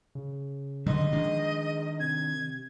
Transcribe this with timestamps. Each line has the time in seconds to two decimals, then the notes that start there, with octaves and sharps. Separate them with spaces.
0.15 C#3
0.86 D3 F#3 G3 D#5
1.13 D#3 F3 G#3 D4
2.00 C3 G#6